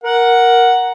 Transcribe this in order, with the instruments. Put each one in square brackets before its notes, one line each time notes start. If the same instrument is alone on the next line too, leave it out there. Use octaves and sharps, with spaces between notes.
[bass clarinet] A#4 [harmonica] F#5